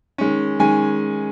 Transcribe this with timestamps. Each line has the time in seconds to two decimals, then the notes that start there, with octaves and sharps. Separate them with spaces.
0.18 D#3 G#3 C#4
0.59 D#3 G#3 C#4 G#5